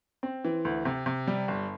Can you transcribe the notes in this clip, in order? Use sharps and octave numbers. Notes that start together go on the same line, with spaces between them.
C4
E3
D2
C3
C3
G3
G1